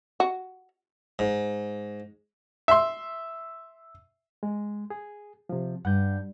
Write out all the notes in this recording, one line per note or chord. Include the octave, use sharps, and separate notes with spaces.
F#4
G#2
E5 C6
G#3
G#4
C3 F3
G2 F#5 G6